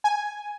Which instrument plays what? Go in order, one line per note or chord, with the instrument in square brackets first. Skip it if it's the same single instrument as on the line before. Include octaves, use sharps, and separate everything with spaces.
[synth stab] G#5